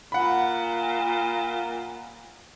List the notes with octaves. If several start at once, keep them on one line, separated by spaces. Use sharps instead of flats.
A#2 F#5 B5